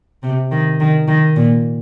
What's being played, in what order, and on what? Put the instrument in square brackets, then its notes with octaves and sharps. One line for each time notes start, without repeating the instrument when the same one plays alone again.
[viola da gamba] C3
D#3
D#3
D#3
A#2